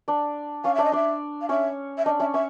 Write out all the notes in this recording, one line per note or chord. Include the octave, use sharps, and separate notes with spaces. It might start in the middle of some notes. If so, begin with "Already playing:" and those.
D4 D5
C#4 C#5 F5
D4 D5 E5
D#5
D4 D5 E5
F5
C#4 C#5 E5
E5
D4 D5 D#5
C#4 C#5 E5
C#4 C#5 E5